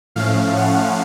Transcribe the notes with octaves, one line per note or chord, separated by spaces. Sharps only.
A2 F3 A3 C#4 F5
F#5